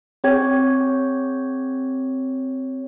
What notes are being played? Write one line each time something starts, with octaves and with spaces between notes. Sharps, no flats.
C4 G#4 C#5 G5 G#6